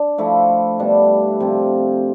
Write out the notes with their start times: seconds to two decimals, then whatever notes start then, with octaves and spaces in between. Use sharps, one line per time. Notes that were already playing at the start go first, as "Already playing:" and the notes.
Already playing: D4
0.18 F3 A3 E4
0.79 B2 G3 D4
1.40 C3 F3 C4 F4